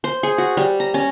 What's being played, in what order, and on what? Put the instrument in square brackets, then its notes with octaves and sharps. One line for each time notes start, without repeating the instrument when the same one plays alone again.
[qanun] C5
G#4
F#4
G3
A#5
C#4